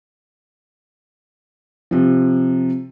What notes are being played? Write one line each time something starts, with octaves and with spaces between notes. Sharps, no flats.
C3 F3